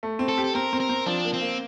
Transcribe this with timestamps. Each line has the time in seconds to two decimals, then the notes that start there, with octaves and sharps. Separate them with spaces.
0.03 A3
0.19 C4
0.29 A4
0.38 G4
0.44 A4
0.55 C4 A#4
0.73 C4
0.80 A#4
0.89 C4
1.06 F3 D4
1.25 A#3
1.34 C4
1.41 A#3